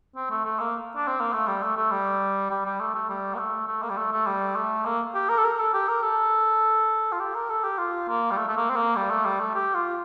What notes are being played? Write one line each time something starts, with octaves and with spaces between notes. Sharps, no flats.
C4
A3
A3
A#3
D4
C4
A#3
A3
G3
A3
A3
G3
G3
G3
A3
A3
G3
A#3
A3
A3
A#3
G3
A3
A3
G3
A3
A#3
G4
A#4
A4
A#4
A4
G4
A#4
A4
F4
G4
A#4
A4
G4
F4
A#3
G3
A3
A3
A#3
C4
A#3
G3
A3
G3
A3
G4
F4